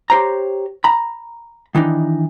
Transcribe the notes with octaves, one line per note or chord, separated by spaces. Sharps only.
G4 C5 C#5 A#5
A#5 B5
D#3 E3 D4 D#4